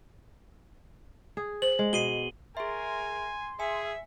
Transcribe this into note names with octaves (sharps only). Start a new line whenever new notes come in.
G#4
C5 F#7
G#3
B2 C7 D#7 G7
G#4 A#4 E5 G#5 C6
G#4 E5 G#5